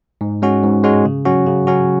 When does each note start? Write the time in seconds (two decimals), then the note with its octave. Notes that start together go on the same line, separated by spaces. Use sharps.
0.21 G#2
0.42 G#3 C#4 F#4
0.63 G#2
0.84 G#3 C#4 F#4
1.05 C#3
1.25 F#3 C#4 F#4
1.47 C#3
1.67 F#3 C#4 F#4